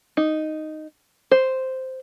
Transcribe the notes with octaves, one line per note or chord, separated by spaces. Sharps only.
D#4
C5